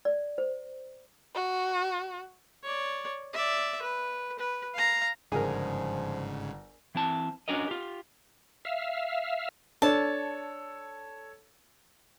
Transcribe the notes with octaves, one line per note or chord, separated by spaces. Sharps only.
D5
C5
F#4
C#5 D5
D5 E5
B4
B4
F5 A#5
G1 G#2 C#3 F3 G#4 A#4
E3 C4 E4 A5
C#4 D4 F#4 A#4 D#5
F4 G4
E5 F5
D4 A4 C#5 A5